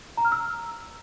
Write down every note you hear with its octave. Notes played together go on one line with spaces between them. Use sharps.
A#5
F6
E6